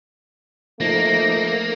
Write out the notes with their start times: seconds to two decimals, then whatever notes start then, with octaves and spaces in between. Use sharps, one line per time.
0.80 F3 A3 A#3 D#4 A#6